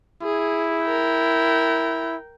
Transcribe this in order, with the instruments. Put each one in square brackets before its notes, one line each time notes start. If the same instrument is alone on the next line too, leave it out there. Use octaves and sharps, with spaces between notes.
[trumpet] E4 [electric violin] G#4
[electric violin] A#4 G5